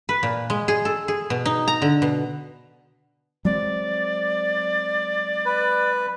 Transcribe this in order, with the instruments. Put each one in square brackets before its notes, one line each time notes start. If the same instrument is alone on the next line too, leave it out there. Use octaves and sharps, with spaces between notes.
[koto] B4
A#2
G#3
G#4
A4
G#4
B2
D#4
A#5
D3
B2
[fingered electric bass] F#3 G#3 C4 [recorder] D5
[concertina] B4